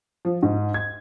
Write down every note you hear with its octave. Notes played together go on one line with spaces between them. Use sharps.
F3
G#2
G#6